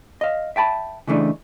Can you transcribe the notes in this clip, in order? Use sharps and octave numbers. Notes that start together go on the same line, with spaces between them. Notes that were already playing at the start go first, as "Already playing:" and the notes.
D#5 F5
E5 G5 A5 B5
C#3 E3 A3 D4 D#4